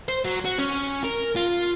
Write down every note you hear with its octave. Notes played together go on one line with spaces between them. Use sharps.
C5
F#3
F#4
C#4
A#4
F4